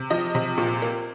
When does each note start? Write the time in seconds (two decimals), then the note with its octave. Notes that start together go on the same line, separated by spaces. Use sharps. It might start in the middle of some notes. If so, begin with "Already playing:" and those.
Already playing: C3
0.10 F3 D#5
0.35 C3
0.58 A#2
0.82 A#3